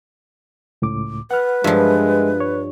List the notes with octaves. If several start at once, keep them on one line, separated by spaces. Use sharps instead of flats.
C#2 A2 D6
B4 F#5 F6
G2 F3 G#3 F4 A#4 E5
C#5